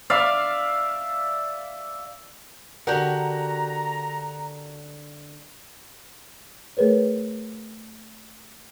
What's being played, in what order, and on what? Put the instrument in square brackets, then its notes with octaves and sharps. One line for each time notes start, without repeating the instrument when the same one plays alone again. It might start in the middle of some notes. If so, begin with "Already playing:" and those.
[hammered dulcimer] D5 E5 F5
[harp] D3 [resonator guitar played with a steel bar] F#4 G4 A#4 [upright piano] F#5 [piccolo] A#5
[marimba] A3 G#4 A#4 B4 C#5